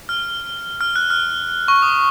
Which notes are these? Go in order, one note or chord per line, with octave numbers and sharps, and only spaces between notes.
F6
F6
F#6
F6
C#6
D#6